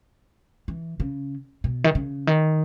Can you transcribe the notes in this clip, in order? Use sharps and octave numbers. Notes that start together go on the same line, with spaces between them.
E3
C#3
B2
D#3
C#3
D#3